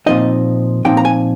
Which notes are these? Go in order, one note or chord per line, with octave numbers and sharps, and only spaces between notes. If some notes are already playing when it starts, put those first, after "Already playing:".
A#2 F3 C4 D#4 D#5
A#2 F3 C4 D#4 G5
A#5
G#5